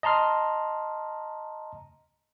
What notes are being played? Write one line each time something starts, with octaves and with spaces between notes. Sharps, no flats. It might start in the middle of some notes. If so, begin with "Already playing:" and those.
D#5 A5 A#5 C6 F6